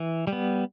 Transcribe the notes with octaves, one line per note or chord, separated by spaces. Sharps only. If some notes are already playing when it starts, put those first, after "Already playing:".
Already playing: E3
G3
B3